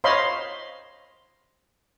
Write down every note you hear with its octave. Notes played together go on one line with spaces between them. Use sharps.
C5 C#5 D#5 F5 B5 C6